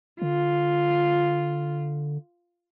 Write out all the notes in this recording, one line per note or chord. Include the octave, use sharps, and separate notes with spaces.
D3 F4